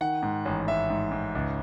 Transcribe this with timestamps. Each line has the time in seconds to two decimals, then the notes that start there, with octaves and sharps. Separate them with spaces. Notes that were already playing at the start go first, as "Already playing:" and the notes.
0.01 D#3 F#5
0.22 G#2
0.45 A1
0.67 A1 E5
0.90 G#2
1.12 G#2
1.35 C#2